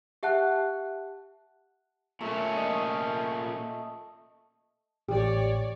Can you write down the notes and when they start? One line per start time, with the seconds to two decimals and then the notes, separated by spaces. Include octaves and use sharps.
0.23 G4 E5 F#5 A5 F#6
2.21 A#2 A3 C#4
2.57 D#5
5.09 A1 G4 C#5 D5